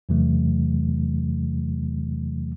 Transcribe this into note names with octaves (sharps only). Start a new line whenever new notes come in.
E2 C3 E3 F#3 A3